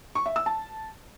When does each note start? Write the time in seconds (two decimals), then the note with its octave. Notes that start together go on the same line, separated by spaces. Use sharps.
0.15 C#6
0.26 E5
0.36 E6
0.46 A5